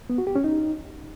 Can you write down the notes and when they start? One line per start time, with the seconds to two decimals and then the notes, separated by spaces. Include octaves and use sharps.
0.10 B3
0.18 F#4
0.27 G4
0.36 C#4
0.44 D#4